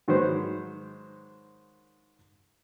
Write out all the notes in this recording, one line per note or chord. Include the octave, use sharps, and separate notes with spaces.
G#2 D#3 F#3 B4 C5